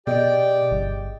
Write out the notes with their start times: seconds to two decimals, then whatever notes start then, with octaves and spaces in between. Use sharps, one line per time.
0.07 B2 G4 G#4 D5 D#5 G5 D7
0.71 G1